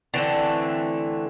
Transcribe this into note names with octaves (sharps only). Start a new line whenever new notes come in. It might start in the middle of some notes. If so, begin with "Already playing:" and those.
D3 E3 A3 C4